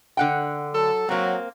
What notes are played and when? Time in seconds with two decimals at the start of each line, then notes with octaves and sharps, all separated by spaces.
0.17 D3 F#5 G5
0.74 F#3 A4
1.09 F#3 A#3 C4